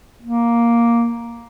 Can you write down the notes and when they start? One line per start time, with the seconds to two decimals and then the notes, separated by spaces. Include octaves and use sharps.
0.22 A#3